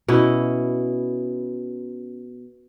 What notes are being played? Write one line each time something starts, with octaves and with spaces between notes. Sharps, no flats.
B2 C#4 E4